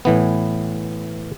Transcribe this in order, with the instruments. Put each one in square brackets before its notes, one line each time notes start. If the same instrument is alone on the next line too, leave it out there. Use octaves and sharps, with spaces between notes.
[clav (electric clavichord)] A2 E3 B3